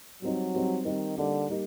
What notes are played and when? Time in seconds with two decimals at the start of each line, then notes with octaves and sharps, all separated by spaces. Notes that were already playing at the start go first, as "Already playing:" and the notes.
0.22 F#3 G3 C4 D#4
0.54 G3 C4 D#4
0.85 D#3 G3 C4 D#4
1.17 D3 G3 A#3 D#4 G4
1.50 G3 A#3 D#4 G4